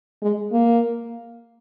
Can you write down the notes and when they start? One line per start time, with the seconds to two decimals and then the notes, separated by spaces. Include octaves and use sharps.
0.22 G#3
0.52 A#3